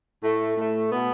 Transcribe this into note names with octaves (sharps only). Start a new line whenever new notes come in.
A2 A3
A2 A3
B2 B3